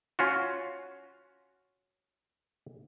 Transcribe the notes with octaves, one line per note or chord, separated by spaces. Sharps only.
C#4 F4 F#4